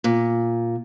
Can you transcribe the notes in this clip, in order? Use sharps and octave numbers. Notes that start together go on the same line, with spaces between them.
A#2